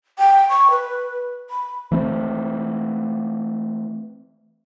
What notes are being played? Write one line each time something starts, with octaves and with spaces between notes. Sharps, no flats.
G5
C#6
B4
B5
E3 A3 C4